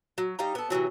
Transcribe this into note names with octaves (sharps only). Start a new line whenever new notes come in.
F#3
G3 D#4 F5 A#5
B3 A4
C3 D#3 E3 F#3